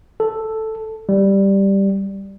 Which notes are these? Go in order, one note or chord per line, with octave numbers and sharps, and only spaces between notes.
A4
G3